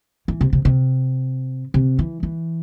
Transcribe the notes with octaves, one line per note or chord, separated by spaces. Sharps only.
E3
C3
C3
C3
C3
E3
E3